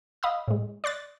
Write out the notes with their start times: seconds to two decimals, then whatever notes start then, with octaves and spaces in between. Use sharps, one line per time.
0.23 D#5 F5 B5 D#6 E6
0.48 A2 G#3
0.84 D5 C6 F#6 A6